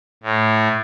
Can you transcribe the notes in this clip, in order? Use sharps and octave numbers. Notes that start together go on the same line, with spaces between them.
A2